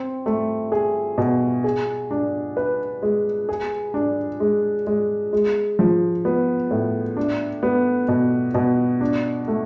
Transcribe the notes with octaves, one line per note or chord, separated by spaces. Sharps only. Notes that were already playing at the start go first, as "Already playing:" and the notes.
Already playing: C4
A3
G#4
B2
G#4
D4
B4
G#3
G#4
D4
G#3
G#3
G#3
F3
B3
A2
D4
B3
B2
B2
D4
A3